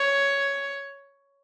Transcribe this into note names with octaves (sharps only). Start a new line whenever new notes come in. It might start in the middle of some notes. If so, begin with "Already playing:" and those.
Already playing: C#5